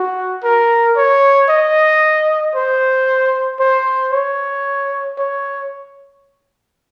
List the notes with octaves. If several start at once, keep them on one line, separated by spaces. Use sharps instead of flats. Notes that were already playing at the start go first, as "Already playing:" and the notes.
Already playing: F#4
A#4
C#5
D#5
C5
C5
C#5
C#5